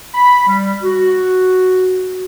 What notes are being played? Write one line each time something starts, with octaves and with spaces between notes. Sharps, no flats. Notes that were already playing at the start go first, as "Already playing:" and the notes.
B5
G3
F#4